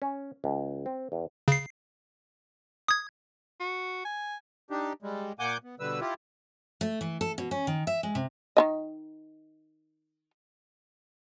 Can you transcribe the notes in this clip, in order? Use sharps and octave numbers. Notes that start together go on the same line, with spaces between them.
C#4
C#2
C4
E2
C#3 C7
D#6 G#6
F#4
G#5
D4 D#4 G4
G3 G#3
A#2 A#3 F#5 G#5 D6 G6
B3
B2 D3 G3 B4 E6
E4 F4 G4
A3
E3
A4
B2
C#4
D#3
E5
G#3
C3
D#3 E3 D#5